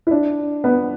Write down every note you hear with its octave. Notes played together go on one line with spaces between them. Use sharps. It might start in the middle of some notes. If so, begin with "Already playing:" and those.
E4
D4
B3